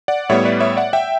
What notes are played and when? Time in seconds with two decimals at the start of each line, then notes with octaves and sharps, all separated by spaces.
0.08 D5 F#5
0.29 A2 G3 B3 C#5 E5
0.45 B4 D5
0.60 C#5 E5
0.77 D5 F#5
0.93 E5 G5